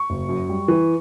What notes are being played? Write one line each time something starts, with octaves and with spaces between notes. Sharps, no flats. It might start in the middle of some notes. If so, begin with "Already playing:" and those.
Already playing: C#6
F#1
F#2
G3
E3